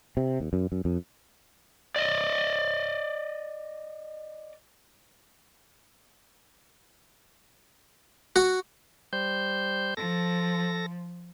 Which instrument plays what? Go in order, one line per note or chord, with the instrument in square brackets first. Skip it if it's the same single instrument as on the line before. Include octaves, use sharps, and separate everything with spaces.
[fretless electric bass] C3
D#2
F#2
F#2
F2
[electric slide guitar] D5 D#5
[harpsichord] F#4
[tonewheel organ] G3 C5 G6
[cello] F3 [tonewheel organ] A4 A#6